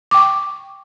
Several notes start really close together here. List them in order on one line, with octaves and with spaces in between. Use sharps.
D6 G5 C#6